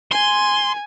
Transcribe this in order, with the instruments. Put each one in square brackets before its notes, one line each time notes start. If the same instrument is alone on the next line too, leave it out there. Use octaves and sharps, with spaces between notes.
[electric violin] G#5 [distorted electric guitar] C6